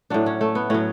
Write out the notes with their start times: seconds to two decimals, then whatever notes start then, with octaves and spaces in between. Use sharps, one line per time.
0.10 A2 F#3 D4
0.26 C#4
0.41 A3
0.55 B3
0.70 A2 F#3 C#4